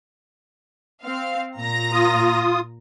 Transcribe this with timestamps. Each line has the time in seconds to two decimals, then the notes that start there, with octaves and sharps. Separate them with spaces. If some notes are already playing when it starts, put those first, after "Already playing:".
1.03 C4 F5
1.58 A#2 A#5 A#6
1.92 F4 D#6